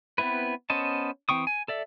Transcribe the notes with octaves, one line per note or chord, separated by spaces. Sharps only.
B3 C4 E4 B4
B3 C#4 C5 D#5 A5
E3 C4 G5 C#6 D#6
G#5
A4 D5 E5